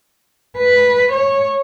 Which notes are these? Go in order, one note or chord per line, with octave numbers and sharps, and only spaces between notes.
B4
C#5